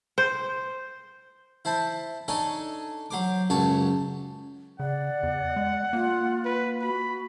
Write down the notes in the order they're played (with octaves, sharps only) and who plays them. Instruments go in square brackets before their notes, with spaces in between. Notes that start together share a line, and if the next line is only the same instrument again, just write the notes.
[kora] C5
[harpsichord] E4 C5 A5 B5
D4 D#4 A4 C#5 G#5
F#3 C5 D6
C#2 F#2 F#4 C#5 A5
[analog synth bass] C#3 [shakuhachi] D5 [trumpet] F#5
[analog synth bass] E2
G#3
[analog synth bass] A#3 [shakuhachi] F4
[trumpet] B4
[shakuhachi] F#4 [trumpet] B5